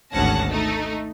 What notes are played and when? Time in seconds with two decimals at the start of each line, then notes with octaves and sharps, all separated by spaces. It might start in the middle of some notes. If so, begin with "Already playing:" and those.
0.12 G#1 D2 C#4 F#5 A5 A#6
0.49 A3 D#4